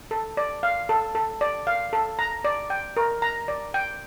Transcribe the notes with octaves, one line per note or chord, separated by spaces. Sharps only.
A4
D5
F5
A4
A4
D5
F5
A4
A#5
D5
G5
A#4
A#5
D5
G5